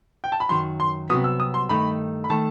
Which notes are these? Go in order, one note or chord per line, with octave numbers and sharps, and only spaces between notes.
G5
A5
B5
F#2 D#3 F#3 C6
C6
C2 C3 F#3 B3 F#4 D#6
E6
D#6
C6
G2 D#3 A3 D#4 B5
B5
D#3 A3 A5